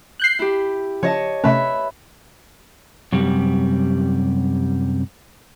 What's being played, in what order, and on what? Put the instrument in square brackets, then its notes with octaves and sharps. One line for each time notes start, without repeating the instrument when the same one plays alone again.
[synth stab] F#6 G6 C7
[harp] E4 G4
[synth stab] C#3 F3 [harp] C#5 D#5 A5
[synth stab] C3 A3 C#4 [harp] B4 E5
[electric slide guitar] F#2 C3 G3